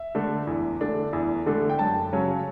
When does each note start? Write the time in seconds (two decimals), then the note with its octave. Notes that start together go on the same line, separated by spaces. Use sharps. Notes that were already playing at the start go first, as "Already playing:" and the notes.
Already playing: E5
0.15 D3 A3 D4
0.47 E2
0.81 D3 A3 D4
1.13 E2
1.46 D3 A3 D4
1.70 G5
1.79 F#2 A5
2.12 C#3 F#3 C#4